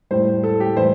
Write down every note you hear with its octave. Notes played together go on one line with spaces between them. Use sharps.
A2 G3 C5
A4
G4
A2 E3 G3 C5